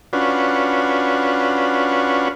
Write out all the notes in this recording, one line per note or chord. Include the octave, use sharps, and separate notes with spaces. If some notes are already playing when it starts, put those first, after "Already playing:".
C#4 D4 F4 F#4 B4